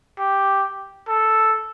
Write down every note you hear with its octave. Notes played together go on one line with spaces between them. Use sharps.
G4
A4